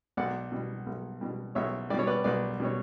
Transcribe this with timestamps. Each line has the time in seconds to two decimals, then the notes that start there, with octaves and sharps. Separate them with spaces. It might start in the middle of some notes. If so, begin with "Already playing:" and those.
0.17 B1 D5 F#5
0.52 B2 G3
0.86 B1
1.21 B2 G3
1.55 B1 C#5 E5
1.90 G3 D5
1.94 B2 C#5
2.07 B4 D5
2.24 B1 B4 D5
2.60 B2 G3 C#5